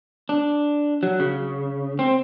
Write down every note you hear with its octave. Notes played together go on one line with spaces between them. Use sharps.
D4
F#3
C#3
C4